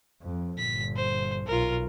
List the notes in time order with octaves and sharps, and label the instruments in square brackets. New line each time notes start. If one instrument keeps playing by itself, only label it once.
[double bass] F2
[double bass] G1 A#2 [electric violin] B6
[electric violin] C5
[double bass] B1 [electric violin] F4 A#4